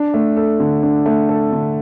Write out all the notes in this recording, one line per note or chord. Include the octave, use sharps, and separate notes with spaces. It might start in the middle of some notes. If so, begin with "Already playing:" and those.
Already playing: D4
A3
A4
D3
D4
A3
A4
D3